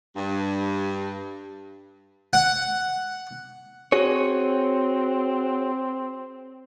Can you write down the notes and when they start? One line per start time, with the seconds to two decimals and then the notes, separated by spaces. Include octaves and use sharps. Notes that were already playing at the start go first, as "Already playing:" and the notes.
0.15 G2
2.33 F#5
3.92 C4 F#4 G#4 C#5